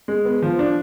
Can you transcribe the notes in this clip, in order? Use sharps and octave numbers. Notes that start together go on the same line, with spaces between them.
G#3
B3
F3
D4